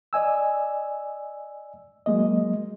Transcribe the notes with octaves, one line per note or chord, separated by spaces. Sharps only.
D5 D#5 G#5 E6
F#3 G#3 A#3 D#5